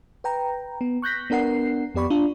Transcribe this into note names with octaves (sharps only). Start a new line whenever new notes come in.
B4 G5 A#5
B3
C#6 F#6 G6 A#6 B6
B3 D4 A#4 F#5 C7
F2 B3 G4 D5 B5 C#6
D4 F4